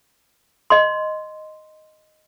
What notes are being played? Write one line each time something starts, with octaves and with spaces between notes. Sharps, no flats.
D#5 C6